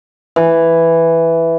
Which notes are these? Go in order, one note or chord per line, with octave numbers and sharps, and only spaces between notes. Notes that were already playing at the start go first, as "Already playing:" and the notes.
E3